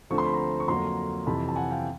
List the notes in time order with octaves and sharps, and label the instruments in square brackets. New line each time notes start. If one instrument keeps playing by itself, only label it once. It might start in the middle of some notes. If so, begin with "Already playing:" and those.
[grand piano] D2 D3 F3 A3 C4 C#6
C6
B5
A#5 C6
C#6
F2 D3 F#3 A#3 A#5 C6
F2 C3 E3 A5 B5
A5
F#5 G#5
F5 G5